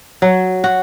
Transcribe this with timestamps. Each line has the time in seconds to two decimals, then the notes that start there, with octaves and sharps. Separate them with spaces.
0.22 F#3
0.64 F#4